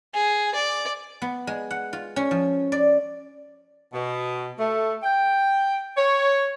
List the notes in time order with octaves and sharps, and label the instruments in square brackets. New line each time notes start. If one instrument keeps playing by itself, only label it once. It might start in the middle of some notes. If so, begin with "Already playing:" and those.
[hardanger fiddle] G#4
D5
[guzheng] B3
G#3
F#5
F4
C#4
F3
D5
[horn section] B2
A3
G5
C#5